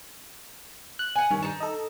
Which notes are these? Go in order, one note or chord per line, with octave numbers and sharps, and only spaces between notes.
F#6
F#5 G#5
G2 D#3 C#4
D#4 A5
A4 D#5